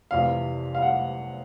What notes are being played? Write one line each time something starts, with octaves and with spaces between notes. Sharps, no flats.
F1 F2 C3 E3 F5
F5
F#5